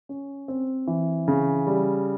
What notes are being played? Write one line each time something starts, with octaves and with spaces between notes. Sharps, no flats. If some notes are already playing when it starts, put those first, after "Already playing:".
C#4
C4
E3
C#3
G3